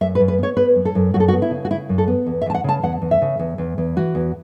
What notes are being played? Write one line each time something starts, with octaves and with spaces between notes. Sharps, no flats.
F#2 E5
B4
F#2
B4
B3 C#5
B3 B4
F#2
A4
F#2
F#2 F#4
A4
F#4
B3
E4
C#3
F#4
C#3 E4
F#2
A4
B3
E2
E5
E2 A5
F#5
C#3 A5
E2 F#5
E2
E5
C#3
E2
E2
E2
E3 F#4
E2